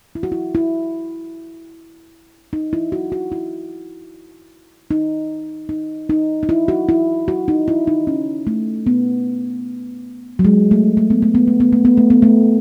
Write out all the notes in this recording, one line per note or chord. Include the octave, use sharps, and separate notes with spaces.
E4
F#4
E4
E4
D#4
E4
F#4
F#4
E4
D#4
D#4
D#4
D#4
E4
F#4
E4
F#4
D#4
E4
D#4
C#4
A3
B3
F#3
G#3
A3
A3
B3
A3
B3
A3
B3
A3
B3
A3
B3
A3